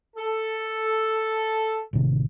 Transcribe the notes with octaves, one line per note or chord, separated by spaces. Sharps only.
A4
A1 C3 D#3